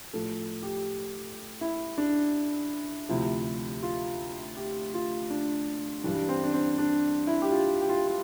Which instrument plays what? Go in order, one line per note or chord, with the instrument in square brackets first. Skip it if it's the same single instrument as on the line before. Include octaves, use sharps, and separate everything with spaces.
[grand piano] A2 F3 A4
G4
E4
D4
D2 C3 F3 E4
F4
G4
F4
D4
G2 E3 G3 D4
C4
D4
C4
D4
E4
G4
F4
G4
F4
F4